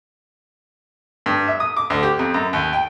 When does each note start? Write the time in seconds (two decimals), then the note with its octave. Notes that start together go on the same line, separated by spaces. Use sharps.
1.26 G2
1.48 E5
1.60 D#6
1.77 D6
1.90 D2
2.03 G4
2.19 F2
2.34 F#2
2.53 D#2
2.73 G5